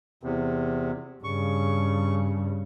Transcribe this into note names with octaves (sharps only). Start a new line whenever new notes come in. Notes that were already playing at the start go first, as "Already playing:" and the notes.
E2 C3
G2 C#3 C#6